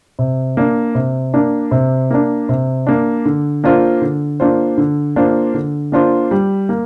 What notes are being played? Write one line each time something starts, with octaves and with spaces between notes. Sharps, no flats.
C3
A#3 D4
C3
A#3 D4
C3
A#3 D4
C3
A#3 D4
D3
A#3 D4 F4 C5
D3
A#3 D4 F4 C5
D3
A#3 D4 F4 C5
D3
A#3 D4 F4 C5
G3
A#3